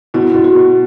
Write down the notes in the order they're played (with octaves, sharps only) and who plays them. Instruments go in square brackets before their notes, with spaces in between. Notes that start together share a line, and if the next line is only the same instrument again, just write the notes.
[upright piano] B2 [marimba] E4
[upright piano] B2
[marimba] F#4
[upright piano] B2